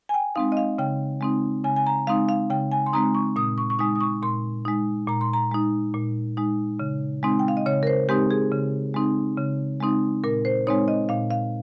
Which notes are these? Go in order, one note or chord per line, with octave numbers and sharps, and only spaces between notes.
G#5
G5
G#3 C4 D#4 F5
D#5
F5
C#3 G5
G#3 C4 D#4
C#3 G#5
G#5
A#5
G#3 C4 D#4 F5
F5
C#3 G5
G#5
C6
G#3 C4 D#4 A#5
C#6
A#2 D#6
C#6
C#6
G#3 D#4 D#6
D#6
C#6
A#2 C6
G#3 D#4
A#2 A#5
C6
A#5
G#3 D#4
A#2
G#3 D#4
C#3
G#3 C4 D#4
G5
F5
D#5
C#3 C#5
A#4
C5
G#3 C4 D#4 G4
G#4
C#3
G#3 C4 D#4
C#3
G#3 C4 D#4
A#2 A#4
C5
G#3 C4 D#4 C#5
D#5
A#2 F5
F5